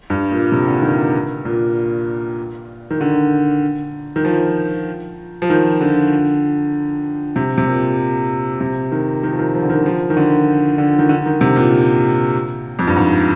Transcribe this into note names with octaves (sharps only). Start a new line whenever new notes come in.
G2
A#2
C3
D3
D#3
A#2
D#3
D3
D#3
F3
F3
D#3
D3
C3
C3
A#2
C3
D#3
D#3
F3
D#3
F3
D3
D#3
F3
D#3
D3
D3
D#3
D3
D#3
C3
A#2
F2
G2
G#2